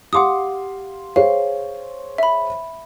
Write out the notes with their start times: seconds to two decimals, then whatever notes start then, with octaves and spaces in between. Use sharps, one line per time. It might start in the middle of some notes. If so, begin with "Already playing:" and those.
0.13 G4 F5 F#5 C6 D6 D#6
1.16 G#4 C5 C#5 F5
2.18 E5 B5